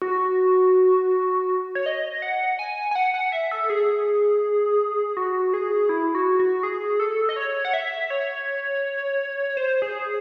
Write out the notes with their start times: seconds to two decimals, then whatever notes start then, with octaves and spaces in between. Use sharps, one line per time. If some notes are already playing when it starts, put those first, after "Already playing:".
0.02 F#4
1.75 C#5
1.86 D#5
2.22 F#5
2.59 G#5
2.91 G#5
2.96 F#5
3.14 F#5
3.32 E5
3.52 A4
3.70 G#4
5.17 F#4
5.54 G#4
5.89 E4
6.15 F#4
6.39 F#4
6.63 G#4
7.00 A4
7.29 D#5
7.36 C#5
7.65 F#5
7.73 E5
8.10 C#5
9.57 C5
9.82 G#4